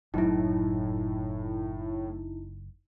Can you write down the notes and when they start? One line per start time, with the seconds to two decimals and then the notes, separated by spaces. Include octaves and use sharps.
0.14 F#1 A2 F#3 D#4 E4